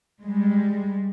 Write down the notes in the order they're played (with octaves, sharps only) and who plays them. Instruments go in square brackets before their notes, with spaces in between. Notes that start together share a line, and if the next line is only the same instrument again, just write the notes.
[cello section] G3 G#3